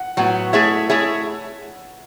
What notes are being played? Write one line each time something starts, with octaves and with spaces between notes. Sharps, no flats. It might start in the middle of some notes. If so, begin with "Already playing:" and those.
Already playing: F#5
A2 F#3 B3 F#5
A3 E4 G#4 C#5 E5
A3 E4 G#4 C#5 E5